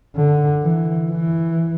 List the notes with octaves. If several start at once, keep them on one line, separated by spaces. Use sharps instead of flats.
D3
E3
E3